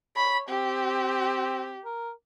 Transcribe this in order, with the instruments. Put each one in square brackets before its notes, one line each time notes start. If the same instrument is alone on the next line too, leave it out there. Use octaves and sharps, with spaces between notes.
[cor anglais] C#5 [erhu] B5
[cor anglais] C4 [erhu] G4
[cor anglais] A#4